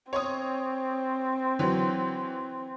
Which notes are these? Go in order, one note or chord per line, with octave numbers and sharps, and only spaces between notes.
C4 C#5 C6 D#6
E3 F#3